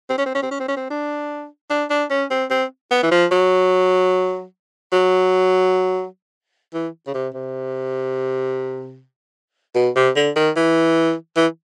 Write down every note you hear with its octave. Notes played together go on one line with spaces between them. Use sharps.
C4
C#4
C4
C#4
C4
C#4
C4
C#4
C4
D4
D4
D4
C#4
C4
C4
B3
E3
F3
F#3
F#3
E3
C#3
C3
C3
B2
C3
D3
D#3
E3
E3